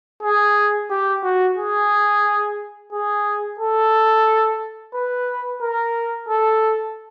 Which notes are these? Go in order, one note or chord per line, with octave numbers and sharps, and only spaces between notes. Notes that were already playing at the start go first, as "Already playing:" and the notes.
G#4
G4
F#4
G#4
G#4
A4
B4
A#4
A4